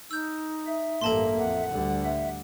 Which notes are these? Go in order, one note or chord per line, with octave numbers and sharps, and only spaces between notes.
D#4 E6 G6
E5
A1 G2 A#3 A4 A5 C6
F2 F#5
D2 D3 G3
E5